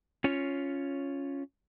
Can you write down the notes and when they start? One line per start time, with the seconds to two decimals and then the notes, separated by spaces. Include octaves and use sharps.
0.24 C#4 F4 C#5